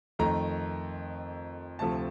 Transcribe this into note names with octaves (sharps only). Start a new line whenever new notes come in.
F2 D#3 A3 A#5
D2 C3 F3 A3 A5